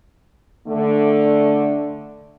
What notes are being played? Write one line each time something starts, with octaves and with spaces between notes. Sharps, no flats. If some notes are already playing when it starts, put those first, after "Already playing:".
D3 A3